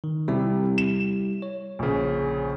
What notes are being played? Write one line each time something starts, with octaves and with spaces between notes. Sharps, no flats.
D#3
C3 G3 E4
E7
C#5
A#1 C#3